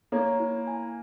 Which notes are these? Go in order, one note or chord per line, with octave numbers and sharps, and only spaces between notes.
A#3 C#5
E4
G#5